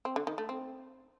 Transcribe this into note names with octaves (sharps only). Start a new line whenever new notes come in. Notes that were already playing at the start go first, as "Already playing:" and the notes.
C4
D3
D#3
A3
C4